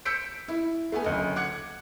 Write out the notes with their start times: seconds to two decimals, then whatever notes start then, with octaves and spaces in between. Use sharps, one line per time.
0.05 E6 G6 B6 C#7 D7
0.48 E4
0.92 A3 B3 B4 G#5
1.04 F#1 D2 D#5
1.36 F#5 D6 F#6 G#6 C#7